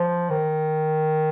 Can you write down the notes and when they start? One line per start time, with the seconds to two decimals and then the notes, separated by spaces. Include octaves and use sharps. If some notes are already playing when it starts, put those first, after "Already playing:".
Already playing: F3
0.30 D#3